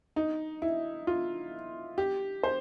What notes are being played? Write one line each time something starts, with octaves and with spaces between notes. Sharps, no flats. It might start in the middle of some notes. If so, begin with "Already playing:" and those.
D#4
E4
F4
G4
C5